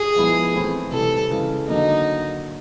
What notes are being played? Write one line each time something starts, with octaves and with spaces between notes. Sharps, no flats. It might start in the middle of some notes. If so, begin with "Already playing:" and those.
Already playing: G#4
F3 G#3 B3 E4
E3 A3 C4 E4
C3 E3 G3 C4 A4
C#3 E3 G#3
D3 F#3 A#3 D4 D#4